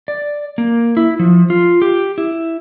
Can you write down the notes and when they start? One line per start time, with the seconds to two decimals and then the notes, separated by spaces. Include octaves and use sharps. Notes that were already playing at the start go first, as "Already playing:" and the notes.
0.08 D5
0.58 A#3
0.97 E4
1.19 F3
1.50 F4
1.82 G4
2.18 E4